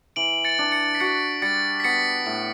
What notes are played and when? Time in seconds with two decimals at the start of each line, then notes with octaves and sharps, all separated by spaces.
0.16 E3 D7 F#7
0.45 A6 C#7
0.59 D4
0.72 A6 C#7
0.95 B6
1.00 F#4 A6 C#7
1.42 G3 A6 C#7
1.80 B6
1.84 B3 A6 C#7
2.26 A2